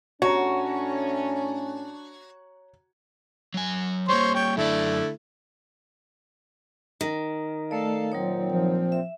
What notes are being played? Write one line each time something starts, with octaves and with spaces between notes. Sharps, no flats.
A2 C#4 D4 F#4 C#5 A#5
F#3 G#5
G3 A#3 C5 C#5 C6
C#5 G5
F#2 D3 A3 E4 D5
D#3
A3 A4 D5 F5 A5
A#2 F#3 C4 D#4 C#5
F3
E5